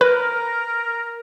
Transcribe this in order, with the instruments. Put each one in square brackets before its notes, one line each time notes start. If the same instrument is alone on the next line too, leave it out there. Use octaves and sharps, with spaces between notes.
[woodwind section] A#4 [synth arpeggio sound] B4